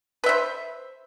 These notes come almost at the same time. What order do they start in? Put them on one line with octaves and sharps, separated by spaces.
B4 E5 C5